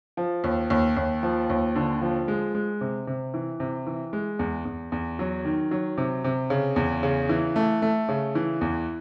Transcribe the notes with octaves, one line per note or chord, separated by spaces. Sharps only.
F3
D#2
D#2
D#2
F3
D#2
D3
F3
G#3
G#3
C3
C3
E3
C3
E3
G#3
E2
E2
E2
F#3
D#3
F#3
C3
C3
C#3
E2
C#3
E3
A3
A3
C#3
E3
E2